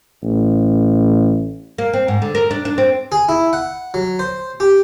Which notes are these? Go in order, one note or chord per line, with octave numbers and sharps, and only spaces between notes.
A1
A#3
C4
G#2
D3
A#4
D4
D4
C4
G#4
E4
F#5
F#3
C5
G4